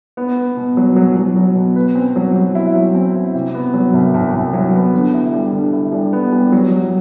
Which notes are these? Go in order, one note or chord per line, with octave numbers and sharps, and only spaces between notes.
B3
B3
B2
F#3
F#3
F#3
F#3
B2
B4
C4
F#3
F#3
E4
F#3
C4
E4
C3
B3
F#3
C2
C2
C2
F#3
B3
D3
E4
G3
D3
E4
G3
B3
G3
F#3
F#3